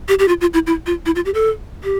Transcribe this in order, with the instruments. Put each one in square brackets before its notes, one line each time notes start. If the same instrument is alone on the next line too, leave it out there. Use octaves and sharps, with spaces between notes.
[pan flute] G4
G4
F4
F4
E4
E4
F4
E4
F4
G4
A4
G4